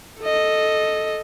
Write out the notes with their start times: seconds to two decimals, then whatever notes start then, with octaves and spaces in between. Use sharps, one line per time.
0.20 A4 D#5